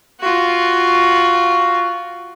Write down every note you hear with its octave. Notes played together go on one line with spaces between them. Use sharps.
F4 F#4